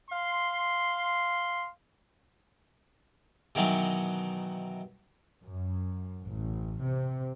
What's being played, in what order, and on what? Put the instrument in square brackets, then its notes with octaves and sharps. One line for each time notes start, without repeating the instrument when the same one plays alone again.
[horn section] F5 C6
[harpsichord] B2 D#3 E3 F#3
[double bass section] F#2
A1
C3